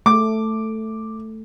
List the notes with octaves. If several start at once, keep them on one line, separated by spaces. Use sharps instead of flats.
A3 D6